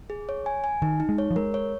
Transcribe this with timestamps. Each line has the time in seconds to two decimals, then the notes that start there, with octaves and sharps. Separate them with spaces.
0.10 G#4
0.29 C#5
0.46 G#5
0.64 G#5
0.82 D#3 D#4
1.00 D#4
1.09 G#3
1.18 C#5
1.31 F3
1.36 G#3 A#4
1.54 C#5